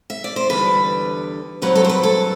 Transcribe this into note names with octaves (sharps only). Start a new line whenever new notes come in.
E5
D5
C5
E2 D3 G3 B4
G2 F#3 C4 B4
A4
C5
B4
A4